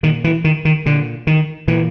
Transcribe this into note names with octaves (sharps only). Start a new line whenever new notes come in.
A#2 D#3
E3
D#3
D#3
A#2 D3
D#3
A#2 E3